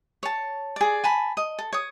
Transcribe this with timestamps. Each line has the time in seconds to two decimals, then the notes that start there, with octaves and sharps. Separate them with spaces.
0.23 C#5 A5
0.76 G#4 D5
1.04 G#5 A5 B5
1.37 D#5
1.59 A4
1.73 C#5 D#6